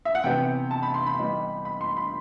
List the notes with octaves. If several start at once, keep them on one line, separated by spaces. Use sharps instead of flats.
E5
F#5
C3 E3 B3 G5
A5
B5
C6
B5
E3 G3 B3 D#4
B5
C6
B5